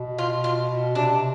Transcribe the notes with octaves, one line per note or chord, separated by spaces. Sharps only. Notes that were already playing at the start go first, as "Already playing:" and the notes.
Already playing: B2
F4
F4
B2
C3 D4